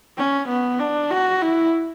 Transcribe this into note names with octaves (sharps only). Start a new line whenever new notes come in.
C#4
B3
D4
F#4
E4